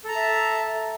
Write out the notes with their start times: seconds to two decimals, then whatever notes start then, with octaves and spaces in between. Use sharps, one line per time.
0.04 A4
0.08 A#5
0.12 A5
0.16 E5